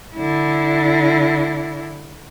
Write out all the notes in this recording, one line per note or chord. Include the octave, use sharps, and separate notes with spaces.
D3 E4